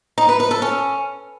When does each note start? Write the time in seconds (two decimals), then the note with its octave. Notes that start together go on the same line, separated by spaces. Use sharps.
0.18 D#4
0.29 B4
0.40 B4
0.51 A4
0.62 C#4